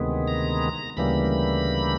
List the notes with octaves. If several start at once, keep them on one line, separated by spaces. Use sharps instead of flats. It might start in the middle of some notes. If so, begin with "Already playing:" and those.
Already playing: D2 C3 D#3 G#3 B3
A#5
D2 C#3 E3 G3 A#3 B5